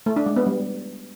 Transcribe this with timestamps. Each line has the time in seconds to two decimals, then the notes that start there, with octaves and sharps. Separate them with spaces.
0.06 A3
0.16 D4
0.26 G#3
0.36 B3
0.46 G3